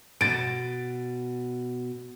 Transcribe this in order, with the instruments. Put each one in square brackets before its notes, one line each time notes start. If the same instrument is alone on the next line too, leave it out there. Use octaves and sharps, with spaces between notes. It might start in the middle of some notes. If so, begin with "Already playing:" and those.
[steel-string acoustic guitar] B2 [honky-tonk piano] A6 D7